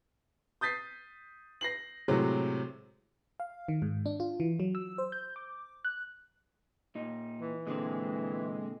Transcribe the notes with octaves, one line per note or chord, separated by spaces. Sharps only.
D#6 G6 A6 B6 C7
A#6 C7 F#7
A2 C3 F#3 G#3
F5
D#3
G#2
D4
F4
E3
F#3
E6
C5
G6
D6
F#6
A#2 D#4
E3
A#2 D3 G#3 C4